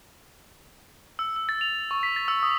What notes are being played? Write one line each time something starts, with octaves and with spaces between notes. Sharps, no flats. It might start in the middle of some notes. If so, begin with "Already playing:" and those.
E6
E6
A6
F7
F7
C#6
B6
A6
E6
D#6